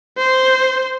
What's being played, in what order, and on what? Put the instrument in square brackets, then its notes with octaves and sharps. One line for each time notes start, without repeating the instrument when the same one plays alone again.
[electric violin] C5